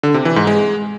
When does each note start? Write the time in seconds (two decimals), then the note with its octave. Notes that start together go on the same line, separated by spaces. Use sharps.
0.03 D3
0.14 C3
0.25 E3
0.36 G#2
0.47 G#3